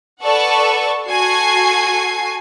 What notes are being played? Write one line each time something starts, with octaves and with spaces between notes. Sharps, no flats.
A4 B4 D5 F#5 A5 C#6
F#4 A4 G#5 C7